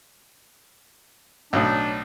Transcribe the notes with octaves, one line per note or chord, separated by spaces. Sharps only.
B1 A2 D4